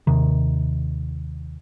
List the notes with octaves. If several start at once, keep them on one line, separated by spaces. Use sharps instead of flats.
D#2 C3 D#3